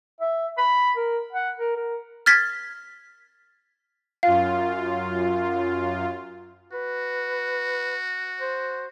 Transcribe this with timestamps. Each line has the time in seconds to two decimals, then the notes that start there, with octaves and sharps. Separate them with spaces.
0.20 E5
0.58 B5
0.97 A#4
1.33 F#5
1.57 A#4
1.76 A#4
2.26 F6 G#6 A6 B6
4.23 F#2 F4 F5
6.72 F#4 B4
8.41 C5